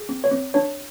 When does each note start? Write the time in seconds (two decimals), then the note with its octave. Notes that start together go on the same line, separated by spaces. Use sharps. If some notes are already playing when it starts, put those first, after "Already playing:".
Already playing: G#4
0.09 C4
0.24 C#5
0.31 C4
0.54 D4 C#5